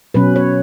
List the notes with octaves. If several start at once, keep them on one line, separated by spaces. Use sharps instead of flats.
B2 F#3 C#4 B4
C#5